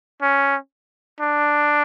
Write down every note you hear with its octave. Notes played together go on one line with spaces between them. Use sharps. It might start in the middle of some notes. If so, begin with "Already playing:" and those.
C#4
D4